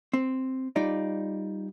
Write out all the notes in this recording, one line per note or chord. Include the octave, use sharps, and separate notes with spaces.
C4
G3 D#4 F4 D5